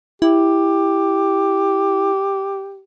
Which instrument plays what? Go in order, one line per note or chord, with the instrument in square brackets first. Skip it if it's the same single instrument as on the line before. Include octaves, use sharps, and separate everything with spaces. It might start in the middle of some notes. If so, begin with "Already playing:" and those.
[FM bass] E4 [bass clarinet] G4